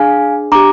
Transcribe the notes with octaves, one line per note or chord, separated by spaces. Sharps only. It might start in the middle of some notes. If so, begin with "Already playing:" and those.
Already playing: D4 G#4 F5 G#5
D4 G4 A#5 D6